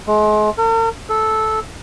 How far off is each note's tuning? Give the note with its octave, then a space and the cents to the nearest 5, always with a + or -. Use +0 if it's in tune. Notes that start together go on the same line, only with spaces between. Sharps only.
G#3 +35
A#4 -45
A4 -10